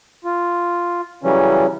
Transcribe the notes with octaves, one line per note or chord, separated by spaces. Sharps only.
F4
C#3 E3 F#3 G3 C#4